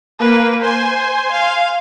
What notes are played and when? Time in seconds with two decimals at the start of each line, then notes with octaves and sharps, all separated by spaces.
0.20 A#3 B4
0.62 C5 G#5 C6
1.32 F5